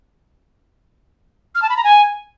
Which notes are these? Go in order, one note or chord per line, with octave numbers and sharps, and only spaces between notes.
F6
A5
B5
A#5
G#5